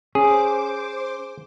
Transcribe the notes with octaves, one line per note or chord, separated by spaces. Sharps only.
C#4 G#4 C5 D6